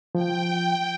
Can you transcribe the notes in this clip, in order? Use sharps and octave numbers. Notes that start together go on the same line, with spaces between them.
F3 G5